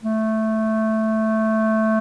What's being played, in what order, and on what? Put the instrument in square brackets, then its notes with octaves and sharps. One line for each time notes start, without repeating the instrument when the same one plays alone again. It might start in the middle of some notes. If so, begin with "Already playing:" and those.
[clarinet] A3